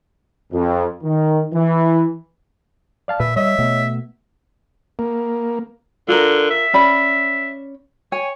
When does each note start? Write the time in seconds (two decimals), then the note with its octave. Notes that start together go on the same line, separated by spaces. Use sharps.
0.53 F2
1.03 D#3
1.54 E3
3.08 D5 F5 A5
3.20 A#2 B4 E5
3.36 G3 C#5 D#5 E5
3.58 B2 A3 B3
4.99 A#3
6.08 D3 F4 A#4
6.51 E5
6.74 C#4 D5 B5
8.12 C#5 G#5